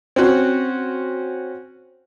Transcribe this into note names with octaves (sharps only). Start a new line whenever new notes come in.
C4 C#4 F#4